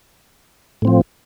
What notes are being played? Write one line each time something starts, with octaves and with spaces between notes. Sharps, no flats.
A2 F3 C4